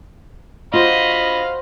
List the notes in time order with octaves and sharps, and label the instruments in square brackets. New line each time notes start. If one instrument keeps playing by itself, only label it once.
[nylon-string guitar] F4 [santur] F#4 C5 [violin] D#5 [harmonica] F5 B5